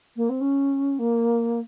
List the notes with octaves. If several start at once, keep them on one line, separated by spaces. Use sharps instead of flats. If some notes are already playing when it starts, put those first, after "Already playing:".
A#3
C4
C#4
A#3